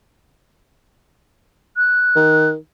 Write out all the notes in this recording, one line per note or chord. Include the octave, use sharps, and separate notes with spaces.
F#6
D#3